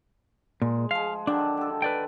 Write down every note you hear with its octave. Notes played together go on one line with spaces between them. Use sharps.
A#2 G#3
F3 G#3 F5
D3 D#3 F#3 D4
G4 A4
B4 D5 G5